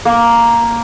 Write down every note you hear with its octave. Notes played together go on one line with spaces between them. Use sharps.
A#3